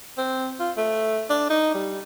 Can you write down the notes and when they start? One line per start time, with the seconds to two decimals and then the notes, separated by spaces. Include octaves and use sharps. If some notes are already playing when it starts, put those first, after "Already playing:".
0.18 C4
0.60 F4
0.77 A3
1.30 D4
1.50 D#4
1.74 G3